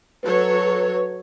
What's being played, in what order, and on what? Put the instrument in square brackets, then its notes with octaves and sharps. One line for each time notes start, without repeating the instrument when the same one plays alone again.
[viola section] F#3 A4 C#5 [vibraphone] B4